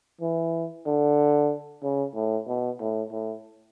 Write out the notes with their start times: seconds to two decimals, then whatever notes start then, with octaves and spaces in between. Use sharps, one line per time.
0.21 E3
0.86 D3
1.83 C#3
2.15 A2
2.48 B2
2.80 A2
3.12 A2